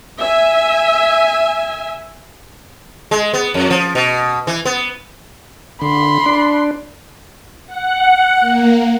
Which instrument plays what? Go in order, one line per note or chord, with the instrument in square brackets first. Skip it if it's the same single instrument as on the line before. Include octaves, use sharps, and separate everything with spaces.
[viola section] E5 G#5
[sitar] G#3
B3
F2
F3
B2
E3
B3
[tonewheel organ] D3 [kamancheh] B5 C6
[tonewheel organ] D4
[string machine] F#5
A#3